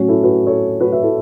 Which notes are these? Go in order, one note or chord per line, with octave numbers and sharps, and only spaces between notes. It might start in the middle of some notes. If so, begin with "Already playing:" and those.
Already playing: A2 F#3 C#4 F#4
E4 A4
F#4 B4
A4 C#5
F#4 B4
B4 E5
E4 A4